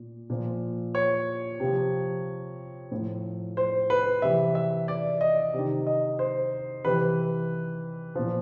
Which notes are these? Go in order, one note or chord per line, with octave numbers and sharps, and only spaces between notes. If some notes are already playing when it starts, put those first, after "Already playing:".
Already playing: A#2
A#2 F3
C#5
C3 F3
A2 F3
C5
B4
C3 E3 E5
E5
D5
D#5
C3
D#3
D#5
C5
C3 E3 B4
A#2 F3